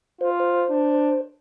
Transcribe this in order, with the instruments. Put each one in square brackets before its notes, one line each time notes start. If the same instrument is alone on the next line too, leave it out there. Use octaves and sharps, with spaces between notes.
[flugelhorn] F4 [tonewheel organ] C5
[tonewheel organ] C5
[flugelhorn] D4